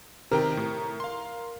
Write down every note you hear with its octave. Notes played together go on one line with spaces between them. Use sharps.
C3 D#3 A#4 G5
A2
F5 C6